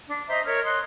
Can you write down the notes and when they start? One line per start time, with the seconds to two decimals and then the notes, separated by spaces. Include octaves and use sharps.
0.07 D4
0.28 C5 D#5 E5 A#5
0.44 A#4 C#5 F6
0.63 D#5 C6 D#6 F#6